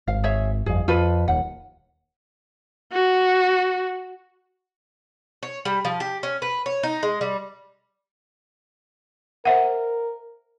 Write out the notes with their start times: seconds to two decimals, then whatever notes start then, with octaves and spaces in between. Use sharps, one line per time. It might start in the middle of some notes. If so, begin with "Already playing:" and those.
0.07 G#1 F5
0.24 G#4 C#5 E5
0.66 G1 F2 G#4
0.88 F2 F4 A4 B4
1.28 D#1 D#2 F#5
2.92 F#4
5.43 C#5
5.65 G3
5.85 F3
6.00 G4
6.23 C#4
6.42 B4
6.66 C#5
6.83 D#4
7.03 G#3
7.21 G3
9.45 A#4 C5 E5 F#5